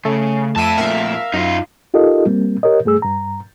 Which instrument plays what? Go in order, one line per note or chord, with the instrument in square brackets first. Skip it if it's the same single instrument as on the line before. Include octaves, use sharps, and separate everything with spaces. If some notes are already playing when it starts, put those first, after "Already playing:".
[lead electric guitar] C#3 [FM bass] A3
[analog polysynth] F2 E5 D#7 [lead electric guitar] G5 A5
[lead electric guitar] F2 A#2 [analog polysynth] A#4 E5 F5
[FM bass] F#2 [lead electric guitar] D#4 F4
[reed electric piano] D#4 F4 G4 A4 A#4 D#5
G3 A#3 C4
G4 A#4 C#5 D#5
G2 A3 G#4 E6
G2 A#5